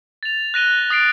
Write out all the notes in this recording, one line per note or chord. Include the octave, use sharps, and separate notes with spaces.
A6 F7
F#6 A#6 D#7 G7
D#6 A6 C7 D7